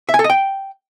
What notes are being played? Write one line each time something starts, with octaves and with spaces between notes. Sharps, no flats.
E5
G#5
A4
D#5
G5